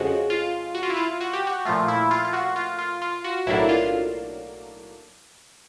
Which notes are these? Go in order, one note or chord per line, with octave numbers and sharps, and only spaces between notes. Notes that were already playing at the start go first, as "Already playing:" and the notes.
Already playing: F2 C#3 F3 G#3 F#4
F4
F#4
F4
E4
F4
F#4
G4
F#4
A#2 F3 A3 F4
E4
F4
F4
F#4
F4
F4
F4
F#4
B1 A2 F#3 A#3 D4 E4
F4